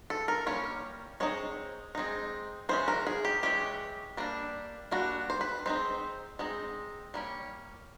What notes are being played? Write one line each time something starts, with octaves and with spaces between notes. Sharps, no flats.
A4
A#4
G3 A#3 C#4 C#5
G#3 C4 D#4 C#5
G#3 C4 D#4
E3 G#3 C#4 C5
A#4
G#4
G4
E3 G#3 C#4 G4
G3 A#3 D4
G3 A#3 D4 F#4
C5
B4
G#3 C4 D#4 C5
G#3 C4 D#4
G3 A#3 C#4